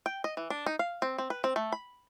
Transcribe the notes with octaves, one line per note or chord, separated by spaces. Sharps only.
G5
D#5
E3
D4
D#4
F5
C4
C4
B4
C4
A3
B5